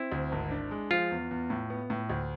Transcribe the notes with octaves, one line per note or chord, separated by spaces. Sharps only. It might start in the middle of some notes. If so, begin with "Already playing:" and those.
Already playing: C4 E4
D2
G#1
D4
G#3
F3 F4
E2
E2
A2
B3
A2
D2